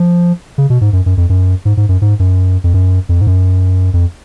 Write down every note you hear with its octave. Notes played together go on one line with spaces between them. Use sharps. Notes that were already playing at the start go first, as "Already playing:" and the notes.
Already playing: F3
C#3
B2
G#2
F#2
F#2
F2
F#2
G#2
G#2
F#2
G#2
F#2
F2
F#2
F2
G#2
F#2
F2